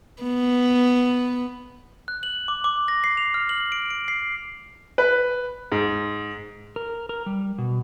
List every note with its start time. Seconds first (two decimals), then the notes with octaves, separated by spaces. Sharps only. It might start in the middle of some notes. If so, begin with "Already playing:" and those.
0.23 B3
2.08 F#6
2.23 F#7
2.48 D6
2.64 D6
2.88 A#6
3.04 C7
3.17 F7
3.34 F6
3.49 F#7
3.72 D7
3.90 D7
4.08 C7
4.98 B4
5.72 G#2
6.76 A#4
7.09 A#4
7.26 G3
7.58 B2